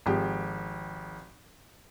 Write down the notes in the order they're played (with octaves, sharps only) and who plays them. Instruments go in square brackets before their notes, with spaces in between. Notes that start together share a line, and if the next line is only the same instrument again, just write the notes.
[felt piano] G#1 F3 G4 G#4